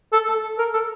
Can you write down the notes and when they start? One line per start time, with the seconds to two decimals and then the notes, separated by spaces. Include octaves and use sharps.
0.13 A4
0.29 A4
0.59 A#4
0.74 A4